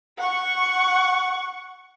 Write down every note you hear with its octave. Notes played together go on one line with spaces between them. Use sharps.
F#5 C#6